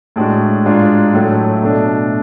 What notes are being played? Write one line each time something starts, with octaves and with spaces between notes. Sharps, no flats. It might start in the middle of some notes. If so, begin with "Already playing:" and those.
A2 G#3 D4 F#4
G#2 G#3 D4 F4
A2 F#3 A3
B2 A3 D4